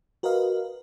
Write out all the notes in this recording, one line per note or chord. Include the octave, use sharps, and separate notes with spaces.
F#4 A#4 B4 D#5 F5